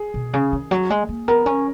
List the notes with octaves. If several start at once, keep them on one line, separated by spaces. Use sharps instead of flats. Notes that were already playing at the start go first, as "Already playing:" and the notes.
Already playing: G#4
B2
C#3
D#3
F#3
G#3
A#3
B3 A#4
C#4